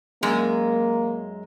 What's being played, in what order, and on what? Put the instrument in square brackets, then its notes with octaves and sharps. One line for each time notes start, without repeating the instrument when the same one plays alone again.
[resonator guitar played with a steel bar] F#2 G#3 [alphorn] A#3